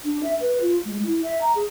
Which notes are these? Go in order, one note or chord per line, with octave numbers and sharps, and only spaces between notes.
D4
E5
B4
F4
G#3
E4
E5
A#5
G#4